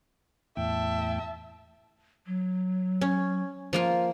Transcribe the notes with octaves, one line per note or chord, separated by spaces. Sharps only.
E2 A2 E5 G5 A5
F#3
C#4
F3 A#3 F4